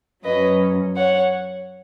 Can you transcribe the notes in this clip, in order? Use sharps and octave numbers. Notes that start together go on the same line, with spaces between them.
F#2 F#3 C#4 B4 D#5
C#5 F#5